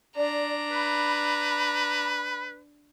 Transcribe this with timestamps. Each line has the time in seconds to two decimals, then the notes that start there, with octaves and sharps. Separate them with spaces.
0.16 D4 D5 A#5
0.71 B4 B5